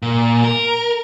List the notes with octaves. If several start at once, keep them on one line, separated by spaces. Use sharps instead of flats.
A#2
A#4